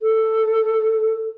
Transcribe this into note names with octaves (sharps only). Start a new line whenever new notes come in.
A4